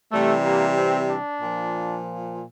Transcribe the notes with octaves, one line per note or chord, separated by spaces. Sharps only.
C3 E3 G3 A3
A#3
C4
D4
A#2 F3